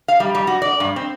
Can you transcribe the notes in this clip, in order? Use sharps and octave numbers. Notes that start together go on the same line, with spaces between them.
F5
G3
G3
F#4
D5
G2
C4